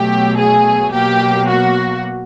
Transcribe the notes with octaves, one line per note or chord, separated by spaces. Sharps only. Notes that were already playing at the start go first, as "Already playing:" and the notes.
Already playing: B2 F#3 A3 G4
G#4
B2 F#3 A#3 G4
F#4